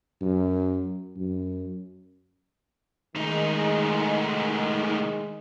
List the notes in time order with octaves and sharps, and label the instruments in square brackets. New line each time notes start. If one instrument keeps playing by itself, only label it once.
[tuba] F#2
F#2
[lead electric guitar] A2 D#4 [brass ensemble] D#3 G#3